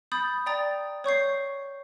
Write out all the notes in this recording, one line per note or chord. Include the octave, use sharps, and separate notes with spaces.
B5 D#6 G6 A6
D5 G5 A#5 D#6 A6
C#5 C#6 G6 C7